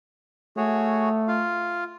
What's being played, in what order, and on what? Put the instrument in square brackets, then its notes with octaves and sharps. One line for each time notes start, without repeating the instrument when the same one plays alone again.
[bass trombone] A3 [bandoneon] F#4 G#4 C#5
[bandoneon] F4 F5